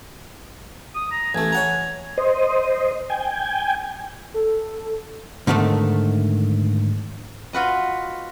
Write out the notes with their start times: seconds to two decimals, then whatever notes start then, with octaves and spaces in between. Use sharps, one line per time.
0.95 D#6
1.11 A#5
1.35 A1 A3 G#5
1.52 C#5 F#5 A#5
2.18 C5 D#5
3.10 G5 G#5
4.34 A4
5.47 G#2 D3 D#3 G#3 A3
7.53 F4 F#4 B4 D#5